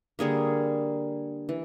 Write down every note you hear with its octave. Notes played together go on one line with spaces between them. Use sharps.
D3 G3 A#3 G#4
E3